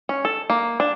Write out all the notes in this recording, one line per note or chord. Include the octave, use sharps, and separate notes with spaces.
C#4
A4
A#3
D4